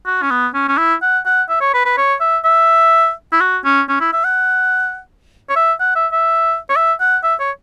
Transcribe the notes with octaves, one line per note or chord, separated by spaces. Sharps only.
F#4
C#4
B3
C#4
C#4
E4
F#5
F#5
E5
C#5
B4
B4
C#5
E5
E5
E4
F#4
C#4
C#4
E4
E5
F#5
C#5
E5
F#5
E5
E5
C#5
E5
F#5
E5
C#5